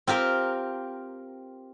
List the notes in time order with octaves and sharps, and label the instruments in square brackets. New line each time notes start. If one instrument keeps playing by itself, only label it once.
[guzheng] C4 F4 G4 A#4